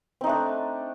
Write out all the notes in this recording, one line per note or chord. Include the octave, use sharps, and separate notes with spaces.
A3 C4 D4 D#4